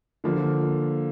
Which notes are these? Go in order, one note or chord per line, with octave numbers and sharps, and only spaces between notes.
D3 F3 A#3